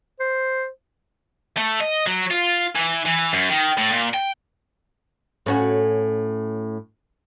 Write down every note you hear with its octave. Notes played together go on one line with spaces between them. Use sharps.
C5
A3
D#5
F#3
F4
E3
E3
F#2
D#3
A2
A#2
G5
A2 C#4 F#4